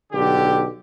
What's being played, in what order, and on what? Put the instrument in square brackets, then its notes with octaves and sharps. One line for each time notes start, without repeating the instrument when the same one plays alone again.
[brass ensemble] B1 D3 G4